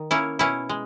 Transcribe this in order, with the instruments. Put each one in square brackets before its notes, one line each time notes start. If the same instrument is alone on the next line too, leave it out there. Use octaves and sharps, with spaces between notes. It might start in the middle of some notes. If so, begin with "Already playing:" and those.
Already playing: [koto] D#3
A#3 C#4 E4
B2 C#4 E4
G#3